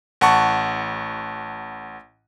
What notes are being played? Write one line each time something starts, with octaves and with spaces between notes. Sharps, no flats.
A1 F#5 A5 C#6